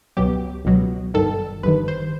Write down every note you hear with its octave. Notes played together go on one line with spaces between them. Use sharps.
C#2 B2 F#3 G4
C#2 B2 F#3
G1 G2 D#3 A4
G1 G2 D#3 B4
C5